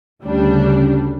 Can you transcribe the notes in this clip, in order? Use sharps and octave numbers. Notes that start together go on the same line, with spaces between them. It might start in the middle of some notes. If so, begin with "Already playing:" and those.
D2 C#3 G3 D4